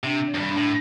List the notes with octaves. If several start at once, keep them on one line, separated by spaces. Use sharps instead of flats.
C3 D4
D#3
F2
G2
D4
A2